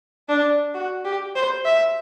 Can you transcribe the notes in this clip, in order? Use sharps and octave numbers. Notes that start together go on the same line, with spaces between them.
D4
F#4
G4
C5
E5